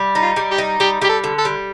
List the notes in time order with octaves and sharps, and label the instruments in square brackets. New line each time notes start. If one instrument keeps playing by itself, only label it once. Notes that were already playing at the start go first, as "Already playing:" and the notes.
Already playing: [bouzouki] G3
D#4
[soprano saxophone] F4
[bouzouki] G3
[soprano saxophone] G4
[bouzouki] D#4
[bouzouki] G3 [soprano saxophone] G4
[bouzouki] G3 [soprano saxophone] G4
[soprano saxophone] A4
[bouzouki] D3
[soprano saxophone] A4
[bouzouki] G3